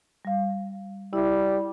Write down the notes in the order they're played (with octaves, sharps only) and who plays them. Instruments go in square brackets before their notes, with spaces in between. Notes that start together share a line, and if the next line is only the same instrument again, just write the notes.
[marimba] G3 F5
[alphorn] G3 [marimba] E4 E5